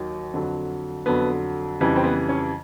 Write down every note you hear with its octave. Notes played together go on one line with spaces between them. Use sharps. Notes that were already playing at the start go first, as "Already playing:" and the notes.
Already playing: D#2 D#3 F#3
F2 D3 F#3
F2 D3 F#3 B3
F2 C#3 E3 G3
C4
B3
C#4